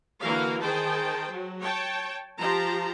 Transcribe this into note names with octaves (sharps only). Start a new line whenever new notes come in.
D3 E3 A#3 F#4 A#4 F5
D#3 G#4 C5 G5 A5
F#3
C#5 G5 A5
F3 G4 A5 A#5 C6